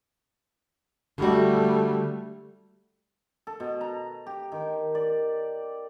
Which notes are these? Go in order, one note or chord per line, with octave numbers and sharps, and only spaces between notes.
D3 G3 A3 F#4
A4
B2
A#5
G4
D#3
D5